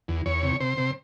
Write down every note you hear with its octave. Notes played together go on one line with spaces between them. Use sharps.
E2
E2 C#5
C3
C3 C5
C3